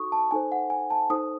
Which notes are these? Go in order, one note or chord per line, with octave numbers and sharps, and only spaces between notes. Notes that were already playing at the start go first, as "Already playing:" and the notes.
Already playing: D#4 F#4 A4 C#6 D#6
A5
D#4 A4 C5 G#5
F#5
G#5
A5
D#4 A4 C5 D#6